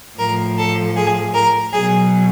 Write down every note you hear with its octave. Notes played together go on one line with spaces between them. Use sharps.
A2 F3 A#4
A4
G#4
A#4
B2 F#3 G#4